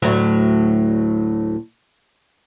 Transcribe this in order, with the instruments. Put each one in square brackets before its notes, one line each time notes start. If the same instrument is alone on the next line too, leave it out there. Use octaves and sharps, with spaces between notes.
[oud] D2 A2 F#3